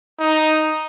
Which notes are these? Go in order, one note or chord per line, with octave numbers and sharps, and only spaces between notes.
D#4